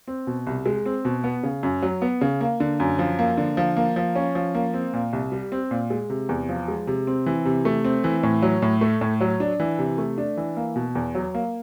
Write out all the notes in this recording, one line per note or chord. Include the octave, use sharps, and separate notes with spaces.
C4
B2
C2
G#3
C4
B2
B3
C#3
F#2
F#3
B3
C#3
A#3
D3
F#2
F3
A#3
D3
F3
A#3
F3
C#4
F3
A#3
C4
A#2
C2
G3
C4
A#2
G#3
C3
E2
F3
G#3
C3
C4
E3
C3
A3
C4
E3
A2
F#3
A2
A3
A2
F#3
D4
E3
C3
A3
D4
E3
A#3
B2
E2
F#3
A#3